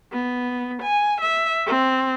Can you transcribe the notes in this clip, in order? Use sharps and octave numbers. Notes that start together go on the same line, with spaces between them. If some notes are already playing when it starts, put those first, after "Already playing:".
B3
G#5
E5
C4